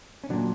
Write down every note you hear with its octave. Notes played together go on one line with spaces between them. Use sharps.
C#4
A#2 D3 F#3 D4